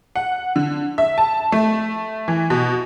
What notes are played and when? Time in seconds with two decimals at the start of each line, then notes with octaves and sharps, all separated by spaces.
0.16 F#5
0.56 D3
0.98 E5
1.18 A5
1.52 A3
2.28 E3
2.50 B2